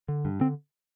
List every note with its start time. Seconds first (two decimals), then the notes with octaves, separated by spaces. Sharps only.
0.08 D3
0.25 G2
0.41 D3 C4